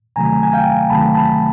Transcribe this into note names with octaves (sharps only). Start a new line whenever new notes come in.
D2 C3 D#3 F#3 A3 G#5 A#5
G#5
F5 G5
D2 C3 D#3 F#3 A3 A5 B5
A5 B5